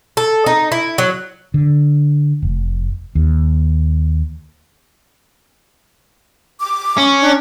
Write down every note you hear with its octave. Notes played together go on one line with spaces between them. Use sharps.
A4
D#4
E4
F#3
D3
F1
D#2
D6
C#4
D4